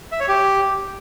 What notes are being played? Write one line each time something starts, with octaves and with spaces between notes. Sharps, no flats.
E5
C#5
G4